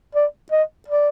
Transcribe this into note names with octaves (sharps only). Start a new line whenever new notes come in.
D5
D#5
D5